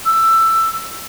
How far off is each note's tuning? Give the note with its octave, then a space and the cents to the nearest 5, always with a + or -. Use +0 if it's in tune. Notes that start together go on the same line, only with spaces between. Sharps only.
E6 +15